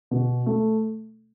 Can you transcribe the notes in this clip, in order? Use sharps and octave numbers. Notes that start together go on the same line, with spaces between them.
B2
A3